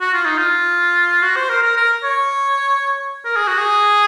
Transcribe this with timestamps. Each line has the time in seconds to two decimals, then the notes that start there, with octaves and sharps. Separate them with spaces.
0.01 F#4
0.13 F4
0.25 D#4
0.37 F4
1.22 F#4
1.36 C5
1.49 A#4
1.63 A#4
1.77 A#4
2.03 C#5
3.25 A#4
3.36 G#4
3.47 F#4
3.58 G#4